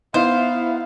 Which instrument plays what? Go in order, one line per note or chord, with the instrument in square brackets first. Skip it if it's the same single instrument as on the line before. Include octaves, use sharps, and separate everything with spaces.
[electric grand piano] B3 [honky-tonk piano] D#4 E4 [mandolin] C5 [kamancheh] F5